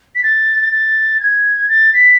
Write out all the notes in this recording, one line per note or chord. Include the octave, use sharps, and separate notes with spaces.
B6
A6
A6
G#6
A6
B6